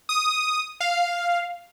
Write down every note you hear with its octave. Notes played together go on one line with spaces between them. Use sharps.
D#6
F5